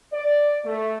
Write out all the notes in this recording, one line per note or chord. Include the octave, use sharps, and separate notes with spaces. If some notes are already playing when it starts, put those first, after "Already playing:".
D5
A3